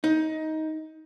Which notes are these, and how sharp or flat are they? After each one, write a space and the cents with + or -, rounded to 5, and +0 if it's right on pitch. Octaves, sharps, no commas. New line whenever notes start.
D#4 +15